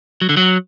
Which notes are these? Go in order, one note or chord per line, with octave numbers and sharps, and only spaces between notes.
F#3
D3
F#3